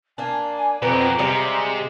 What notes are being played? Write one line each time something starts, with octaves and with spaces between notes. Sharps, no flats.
A#3 D4 G#5
F2 B2 G4 B4 A#5
C3 G3 G#3 G#4 F5